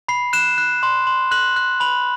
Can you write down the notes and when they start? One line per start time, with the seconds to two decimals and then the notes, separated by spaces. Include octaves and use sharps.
0.08 B5 C7
0.33 F#6 E7
0.58 F#6
0.83 C6
1.07 C6
1.31 F#6 F#7
1.56 F#6
1.80 B5 F#7